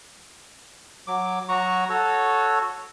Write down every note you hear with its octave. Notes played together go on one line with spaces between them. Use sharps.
F#3 D6
F#3 F#4 A#5 C#6
F#4 A4 C#5